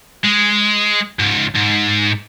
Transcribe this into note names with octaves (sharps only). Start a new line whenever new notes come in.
G#3
C#2 G#2
G#2